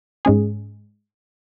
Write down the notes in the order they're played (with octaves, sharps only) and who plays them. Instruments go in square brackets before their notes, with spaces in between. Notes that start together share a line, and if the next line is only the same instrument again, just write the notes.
[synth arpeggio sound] G#2 G#3 C#4 G#4